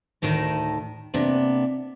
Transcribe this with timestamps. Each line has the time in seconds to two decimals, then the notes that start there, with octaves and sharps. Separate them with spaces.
0.22 D2 A2 D#3 A#4 A5
1.14 C3 A#3 B3 D4